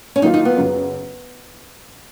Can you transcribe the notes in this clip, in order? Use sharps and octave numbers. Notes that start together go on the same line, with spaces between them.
C#4
D#3 F#3 A#3 D#4 F4
D#4
B3
F#2 C#3 F#3